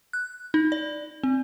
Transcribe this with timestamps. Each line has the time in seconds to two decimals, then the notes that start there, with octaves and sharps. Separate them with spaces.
0.13 F#6
0.54 D#4
0.72 D5
1.23 C4